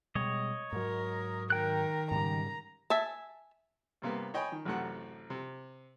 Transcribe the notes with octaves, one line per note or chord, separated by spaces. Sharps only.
B2 G3 G#3 C#5 D#5
G#2 F#3 A#4
D#3 A#4 G5 F#6
G#2 C#3 G3 A#5
E5 G#5 A5
G2 C3 A#3 B3
C#5 D#5 G5 G#5 B5
D#3
A1 F#2 C3 A3 F#5
C3